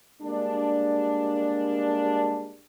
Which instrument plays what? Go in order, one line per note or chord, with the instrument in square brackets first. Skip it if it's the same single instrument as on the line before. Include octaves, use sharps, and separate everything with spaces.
[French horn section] G3 G#3 A#3 D4